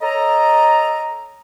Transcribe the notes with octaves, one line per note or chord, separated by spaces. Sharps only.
A4 C#5 D#5 A#5